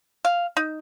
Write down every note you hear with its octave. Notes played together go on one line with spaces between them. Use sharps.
F5
D#4